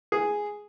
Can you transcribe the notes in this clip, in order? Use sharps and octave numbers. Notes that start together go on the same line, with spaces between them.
G#4